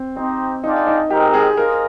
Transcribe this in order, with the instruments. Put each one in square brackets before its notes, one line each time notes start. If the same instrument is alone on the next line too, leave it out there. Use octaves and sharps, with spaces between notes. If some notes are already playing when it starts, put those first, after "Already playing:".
Already playing: [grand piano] C4
[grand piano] C4 [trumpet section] D#4 G4 C5 D#5
[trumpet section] D4 F4 G#4 D5 G5 [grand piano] D#4
[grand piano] D#4
[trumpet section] G#3 C4 D#4 A#4 [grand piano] G4
[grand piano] G#4
[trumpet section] F4 G#4 C5 D#5 [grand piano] A#4